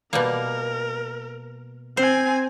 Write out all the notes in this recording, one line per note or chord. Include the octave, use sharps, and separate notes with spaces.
B2 G3 A#3 A#4
C4 C5 G#5